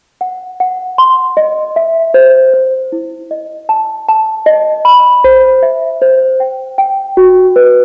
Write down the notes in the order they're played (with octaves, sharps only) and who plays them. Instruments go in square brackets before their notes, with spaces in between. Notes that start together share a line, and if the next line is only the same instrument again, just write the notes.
[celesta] F#5
F#5
C6
D#5
E5
C5
C5
E4
D#5
A5
A5
D#5
B5
C5
E5
C5
G5
G5
F#4
B4